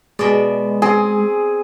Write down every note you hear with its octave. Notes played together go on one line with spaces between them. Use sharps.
B2 G#3 D5
C4 G#4